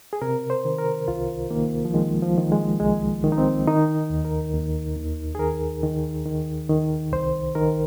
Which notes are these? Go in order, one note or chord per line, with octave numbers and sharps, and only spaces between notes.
G#4
C3 A#4
C5
D#3
A#4
C2 F4
D#3 A#3
F3
D#3 G#3
F3
D#3
G#3
C2 G#3
D#3
D#4
C4
D#3 D#4
D#2
A#4
D#2
D#2
G#4
D#3 A#4
D#3
D#3
D#3
C2 C5
D#3 A#4